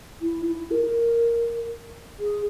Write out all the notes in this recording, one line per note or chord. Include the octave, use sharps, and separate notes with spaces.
E4
E4
A#4
G#4